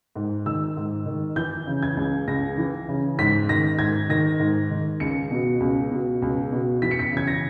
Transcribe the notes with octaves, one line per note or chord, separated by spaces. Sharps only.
G#2
D#3 E6
G#2
D#3
E3 G6
C#3
G#6
C#2
C#2 A#6
E3
C#3
G#2 B6
D#3 A#6
G#2 G#6
D#3 A#6
G#2
D#3
C#2 C#7
B2
C#2
B2
C#2
B2
E3 B6
C#7
B6
C#3 G#6
A#6